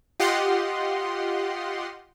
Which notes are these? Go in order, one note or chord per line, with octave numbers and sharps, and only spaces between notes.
F4 G4 D#5 F#5 C6